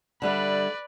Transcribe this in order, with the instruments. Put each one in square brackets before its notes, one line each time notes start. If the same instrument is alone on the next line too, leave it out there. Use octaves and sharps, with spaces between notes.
[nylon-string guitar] D3 G3 E5 [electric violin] B4 D5